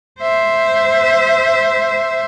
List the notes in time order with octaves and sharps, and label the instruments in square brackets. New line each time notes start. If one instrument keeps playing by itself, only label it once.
[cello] C5 E5